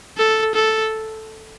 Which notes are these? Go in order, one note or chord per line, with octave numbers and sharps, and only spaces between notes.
A4
A4